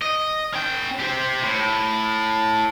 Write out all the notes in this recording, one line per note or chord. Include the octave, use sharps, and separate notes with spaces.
D#5
C#4 G5
G4 C5
A2